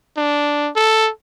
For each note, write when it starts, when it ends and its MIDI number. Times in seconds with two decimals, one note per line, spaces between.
0.17 0.70 62
0.76 1.10 69